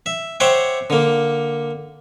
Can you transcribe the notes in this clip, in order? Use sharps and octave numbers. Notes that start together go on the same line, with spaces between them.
E5
C5 C#5 E5 F#5 G5 D6
D3 A#3